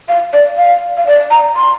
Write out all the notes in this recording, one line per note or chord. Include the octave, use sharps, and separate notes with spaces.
F5
D5
F5
F5
D5
A#5
C6